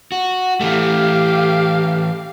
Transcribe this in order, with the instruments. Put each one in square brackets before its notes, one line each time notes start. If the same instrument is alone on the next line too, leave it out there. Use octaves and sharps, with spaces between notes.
[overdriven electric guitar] F#4
[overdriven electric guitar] E3 A3 [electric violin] G4 F5